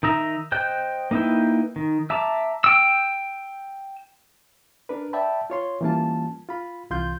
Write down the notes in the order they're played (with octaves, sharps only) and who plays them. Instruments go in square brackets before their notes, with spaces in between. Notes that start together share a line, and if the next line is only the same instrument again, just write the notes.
[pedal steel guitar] D#3 D#4 E5 A#5
C5 D#5 G5 F#6 G6
A#3 D#4 E4 B4 G5
D#3
E5 A5 A#5 D6
G5 E6
[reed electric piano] D4 A#4 B4
D5 E5 G5 A5 B5
F4 C#5 C6
E3 G3 A#3 C#4 F4 A5
F4 B5
C2 E3 F4 C6 G6